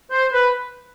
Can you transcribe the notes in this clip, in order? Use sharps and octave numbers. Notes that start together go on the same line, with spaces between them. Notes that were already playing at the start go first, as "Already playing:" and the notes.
C5
B4